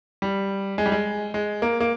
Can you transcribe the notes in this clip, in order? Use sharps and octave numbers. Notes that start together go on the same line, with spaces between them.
G3
G#3
G3
G#3
G#3
A#3
A#3